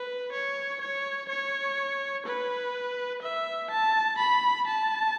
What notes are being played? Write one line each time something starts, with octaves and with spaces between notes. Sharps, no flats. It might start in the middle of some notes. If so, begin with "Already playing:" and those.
Already playing: B4
C#5
C#5
C#5
B4
E5
A5
B5
A5